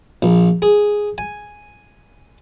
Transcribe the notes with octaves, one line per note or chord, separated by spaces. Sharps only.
A#1
G#4
G#5